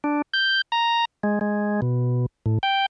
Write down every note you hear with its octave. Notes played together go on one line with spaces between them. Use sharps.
D4
G6
A#5
G#3
G#3
B2
A2
G5